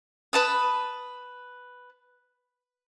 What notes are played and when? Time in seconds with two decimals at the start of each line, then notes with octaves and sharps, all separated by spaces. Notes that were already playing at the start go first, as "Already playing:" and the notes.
0.33 B4 A5 D#6